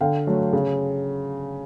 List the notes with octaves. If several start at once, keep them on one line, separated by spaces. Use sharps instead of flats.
D3 F5 G5
F#3 A3
C#3